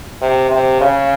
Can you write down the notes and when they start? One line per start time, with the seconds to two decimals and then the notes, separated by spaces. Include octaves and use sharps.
0.22 C3
0.51 C3
0.81 C#3